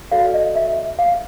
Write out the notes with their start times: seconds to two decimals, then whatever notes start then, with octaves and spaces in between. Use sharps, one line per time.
0.12 F#4 A4 D5 F5
0.34 D#5
0.55 E5
0.99 F5